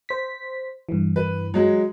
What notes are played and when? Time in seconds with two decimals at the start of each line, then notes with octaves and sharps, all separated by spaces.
0.09 C5 B6
0.89 G2 E3
1.16 B4
1.54 F#3 G#3